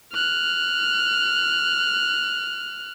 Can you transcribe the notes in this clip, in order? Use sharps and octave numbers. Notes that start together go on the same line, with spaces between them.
F6 F#6